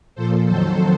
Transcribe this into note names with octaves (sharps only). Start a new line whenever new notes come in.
A#2 F3 A4 C5
F2 D#3 F#3 A4 C5